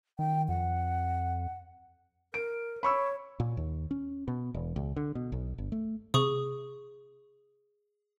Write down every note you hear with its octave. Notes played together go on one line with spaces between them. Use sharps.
D#3 G5
F2 F#5
A#4 D7
C#5 B5 C#6 E6
A#2
D#2
C#4
B2
E1
C#2
D3
B2
B1
G1
A3
C3 G#4 C#6 D#6